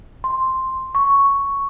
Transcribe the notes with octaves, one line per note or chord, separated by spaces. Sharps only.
C6
C#6